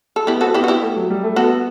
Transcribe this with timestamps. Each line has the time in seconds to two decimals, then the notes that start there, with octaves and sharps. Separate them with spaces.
0.16 A4
0.27 B3 E4 G4
0.41 C4 F#4 A4
0.54 B3 E4 G4
0.64 F#4
0.68 E4 G4
0.82 A3
0.96 F#3
1.10 G3
1.23 A3
1.36 B3 F#4 A4